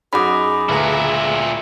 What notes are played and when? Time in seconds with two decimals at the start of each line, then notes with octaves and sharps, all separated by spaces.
0.13 F#2 D#4 F#4 G#4 B5 D6
0.69 D2 A#2 E4 B4 A#5